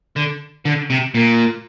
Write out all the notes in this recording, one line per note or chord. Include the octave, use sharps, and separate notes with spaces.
D3
D3
C3
A#2